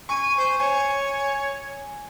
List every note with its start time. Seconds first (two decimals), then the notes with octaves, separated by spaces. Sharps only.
0.09 G#5 C#6
0.37 C5
0.60 C#5 G#5